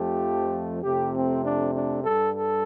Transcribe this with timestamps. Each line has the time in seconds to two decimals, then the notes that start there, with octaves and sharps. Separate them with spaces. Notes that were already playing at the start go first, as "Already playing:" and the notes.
Already playing: F2 F3 A3 G4
0.83 F2 C3 A3 G4
1.14 C4
1.44 D4
1.74 D4
2.04 G2 G3 A4
2.34 A4